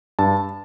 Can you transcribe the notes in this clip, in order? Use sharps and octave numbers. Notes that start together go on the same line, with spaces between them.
G2 A5